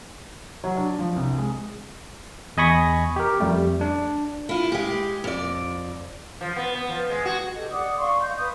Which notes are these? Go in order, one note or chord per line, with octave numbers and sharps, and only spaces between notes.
F#3
D4
F3
C2
G#3
E2 D#5 G#5 B5 C#6 A#6
G4 A#4
F2 G3 A3
D4
E4 F4
G#3 G4
F2 D5
F3
B3
B3
F3
G#3
F#4
G4 A4 D#5
D5 F#5 D6 D#6
D5 F5 C6 C#6
D#5 G6
B4 D#6